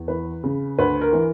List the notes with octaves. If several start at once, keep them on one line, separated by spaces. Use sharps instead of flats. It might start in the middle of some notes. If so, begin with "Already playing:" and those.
Already playing: E2
E3 B4
C#3
D2 B4
A#4
E3